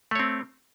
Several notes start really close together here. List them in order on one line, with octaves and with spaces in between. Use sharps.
A3 C#5 C4